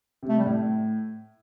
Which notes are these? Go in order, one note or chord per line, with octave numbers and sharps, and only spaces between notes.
C3
A3
G3
A2